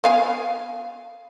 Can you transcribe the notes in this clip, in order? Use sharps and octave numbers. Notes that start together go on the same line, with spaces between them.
B3 F5 G#5